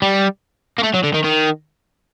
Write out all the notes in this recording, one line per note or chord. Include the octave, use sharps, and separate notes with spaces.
G3
A#3
A3
F#3
D3
D#3
D#3